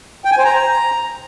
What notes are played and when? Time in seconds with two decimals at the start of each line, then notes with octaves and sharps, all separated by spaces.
0.25 G5
0.32 G#5
0.38 C5
0.45 A#5